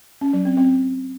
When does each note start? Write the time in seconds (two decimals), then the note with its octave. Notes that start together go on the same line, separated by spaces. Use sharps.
0.21 C#4
0.33 F#3
0.45 C4
0.57 C4